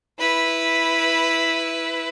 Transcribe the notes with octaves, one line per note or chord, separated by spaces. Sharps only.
E4 B4